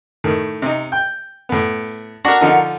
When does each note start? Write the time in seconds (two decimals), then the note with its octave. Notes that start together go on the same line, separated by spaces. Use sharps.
0.24 A2 D#3
0.62 C3 D#4
0.92 G5
1.49 A2 B3
2.25 D4 F#4 A#4
2.41 D3 F3 D#4